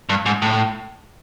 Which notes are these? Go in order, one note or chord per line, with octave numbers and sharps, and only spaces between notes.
G2
G#2
A2